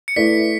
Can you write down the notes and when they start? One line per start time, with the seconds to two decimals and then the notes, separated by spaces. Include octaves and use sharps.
0.08 C#7
0.16 A3 E4 B4 D5 B6